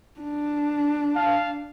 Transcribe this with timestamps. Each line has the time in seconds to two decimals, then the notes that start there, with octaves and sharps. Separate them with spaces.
0.20 D4
1.15 F5 A5